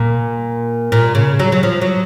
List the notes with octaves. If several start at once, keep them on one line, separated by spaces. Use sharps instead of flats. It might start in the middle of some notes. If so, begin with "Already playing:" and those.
Already playing: A#2
A#2
C#3
F#3
F#3
F3
F#3